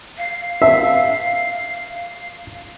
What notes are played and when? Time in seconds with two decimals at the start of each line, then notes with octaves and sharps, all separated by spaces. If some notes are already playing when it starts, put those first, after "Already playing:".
0.17 F5
0.62 E5